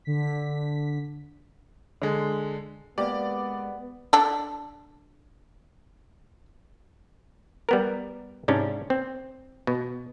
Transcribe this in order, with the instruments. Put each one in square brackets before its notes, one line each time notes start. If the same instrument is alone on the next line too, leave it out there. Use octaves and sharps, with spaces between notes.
[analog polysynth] D3 B6
[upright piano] D3 G#3
[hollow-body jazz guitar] G#3 A#3 G4 [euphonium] B3 [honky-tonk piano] D5
[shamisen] D4 A4
[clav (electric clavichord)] G3 B3 A#4
G#2 C3 C#4 D4
C4
B2